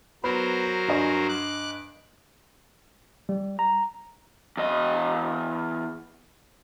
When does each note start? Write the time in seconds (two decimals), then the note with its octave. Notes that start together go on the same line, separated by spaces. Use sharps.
0.24 F#3 B3 A#4 C5 B5
0.88 G2 D#5 G#5
1.29 D6 F#6
3.29 G3
3.59 A#5
4.57 E2 D#5